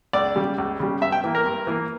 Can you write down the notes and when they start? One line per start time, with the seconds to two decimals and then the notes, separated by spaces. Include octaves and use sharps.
0.13 C#2 D5
0.36 C#3 G3
0.58 C#2
0.80 C#3 G3
1.01 G2 E5
1.12 G5
1.24 E3 A#3
1.35 A#4
1.46 G2
1.67 E3 A#3